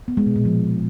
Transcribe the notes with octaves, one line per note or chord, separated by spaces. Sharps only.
B3
G#3
B2
A#2
F3